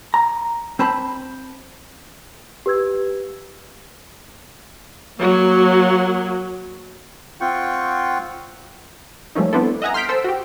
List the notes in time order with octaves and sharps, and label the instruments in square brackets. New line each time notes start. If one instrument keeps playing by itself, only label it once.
[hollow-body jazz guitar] A#5
C4 C5 A5 B5
[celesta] G4 B4 E6 G#6
[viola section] F#3 A#3
[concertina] C4 F4 F#5 G5 C#6
[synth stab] F3 G3 A3 A#3 C#4 D#4
B3 C4 D4 E4 A4
D#5 E5 F#5 G#5 A#5
C6 F6 G6 B6 D7
A4 C5 E6
F#4 G4